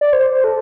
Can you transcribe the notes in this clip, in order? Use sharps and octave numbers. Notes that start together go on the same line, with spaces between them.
D5
C5
A4